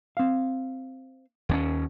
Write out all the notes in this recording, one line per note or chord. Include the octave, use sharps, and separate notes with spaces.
C4 F5
D#2 C4 C#4